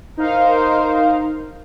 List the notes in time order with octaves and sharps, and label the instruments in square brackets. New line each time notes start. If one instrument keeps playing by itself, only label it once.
[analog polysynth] D#4 F5 [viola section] A#4 C5